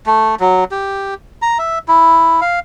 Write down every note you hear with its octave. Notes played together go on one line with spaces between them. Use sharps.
A3
F#3
G4
A#5
E5
E4
F5